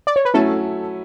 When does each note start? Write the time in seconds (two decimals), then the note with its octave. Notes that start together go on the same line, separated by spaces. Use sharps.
0.07 D5
0.16 C#5
0.25 B4
0.34 F#3 A3 C#4 E4 A4